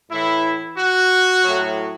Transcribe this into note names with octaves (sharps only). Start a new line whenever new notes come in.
A2 E3 E4
F#4
A2 F#3